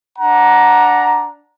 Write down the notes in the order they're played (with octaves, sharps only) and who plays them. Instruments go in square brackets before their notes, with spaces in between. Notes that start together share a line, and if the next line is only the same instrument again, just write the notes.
[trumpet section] D4 F#5 A#5